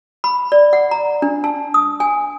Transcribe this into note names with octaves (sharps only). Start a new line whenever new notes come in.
B5
D5
F#5
A#5
D4
A5
D#6
G#5